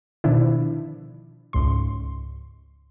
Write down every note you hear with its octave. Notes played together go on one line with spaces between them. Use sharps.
B2 D3 D#3 F3 D4 E4
C#2 G#2 C6